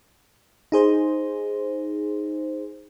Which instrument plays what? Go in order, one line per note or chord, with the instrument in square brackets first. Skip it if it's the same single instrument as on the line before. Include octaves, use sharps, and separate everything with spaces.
[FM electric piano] D#4 G#4 C5